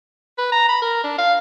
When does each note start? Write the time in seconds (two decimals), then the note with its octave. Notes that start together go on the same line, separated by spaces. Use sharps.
0.38 B4
0.52 A#5
0.69 B5
0.82 A#4
1.03 D4
1.18 F5